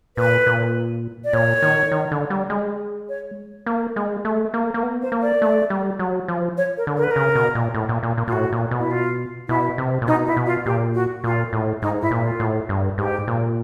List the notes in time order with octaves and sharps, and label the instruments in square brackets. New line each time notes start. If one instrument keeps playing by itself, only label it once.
[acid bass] A#2 [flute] B4
[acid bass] A#2
[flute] D5
[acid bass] A#2 [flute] C#5
[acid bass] D#3
D#3
D3
G3
G#3
[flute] C#5
[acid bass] A#3
G#3
A3
A#3
A#3
B3
[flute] C5
[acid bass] A#3
[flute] D5
[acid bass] A3
G3
F#3
F3
[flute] C#5
A#4
[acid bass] D3
[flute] A#4
B4
[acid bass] C#3 [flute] A#4
[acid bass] B2
A#2
A2
A#2
A#2
A#2
[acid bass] A#2 [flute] F4
[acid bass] A2 [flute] F#4
[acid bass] A#2
B2
[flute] E4
F4
[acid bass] B2 [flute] E4
[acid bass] C3
A#2
[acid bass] B2 [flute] D#4
[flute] E4
[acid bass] B2
[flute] F4
[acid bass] A#2 [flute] G4
[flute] F#4
[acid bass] A#2 [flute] F4
[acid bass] A2
[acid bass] G#2 [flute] D#4
[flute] E4
[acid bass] A#2
[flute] F4
[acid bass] A2
G2
[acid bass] G#2 [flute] G4
[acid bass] A#2